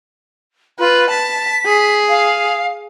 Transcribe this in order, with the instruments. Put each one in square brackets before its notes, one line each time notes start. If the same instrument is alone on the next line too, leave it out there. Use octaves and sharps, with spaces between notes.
[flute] F4 [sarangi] B4
[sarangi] A5 [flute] B6
[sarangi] G#4
[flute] F5